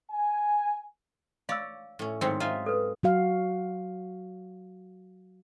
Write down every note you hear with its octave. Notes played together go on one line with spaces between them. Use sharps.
G#5
C#5 D5 F5 E6
A2 C#4
G#2 D#3 F#3 C4 G5
D#4 F4 E5 G#5
A4 B4
F#3 F#4 F5